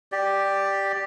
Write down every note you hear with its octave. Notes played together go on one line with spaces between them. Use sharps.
G4 D5